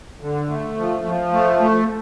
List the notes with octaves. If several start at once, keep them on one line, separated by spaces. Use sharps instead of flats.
D3
A3
F3
F3
A3
A3